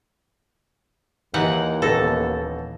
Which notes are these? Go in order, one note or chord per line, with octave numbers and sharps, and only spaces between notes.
D#2 E3 D#4 F#5
D#1 B3 A4 A#6